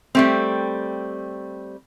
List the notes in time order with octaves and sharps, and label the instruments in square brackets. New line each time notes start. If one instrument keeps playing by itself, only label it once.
[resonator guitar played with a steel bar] G3 A3 C4